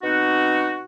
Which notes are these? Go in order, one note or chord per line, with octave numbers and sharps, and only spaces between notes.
B2 C4 D#4 F#4